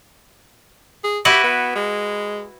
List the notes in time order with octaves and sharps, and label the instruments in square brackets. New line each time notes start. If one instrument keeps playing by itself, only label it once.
[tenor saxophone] G#4
[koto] E4 F#4 B4 [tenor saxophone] G4
[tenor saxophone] B3
G#3